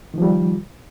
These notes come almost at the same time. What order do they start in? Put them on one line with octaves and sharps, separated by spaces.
D#3 F3 G3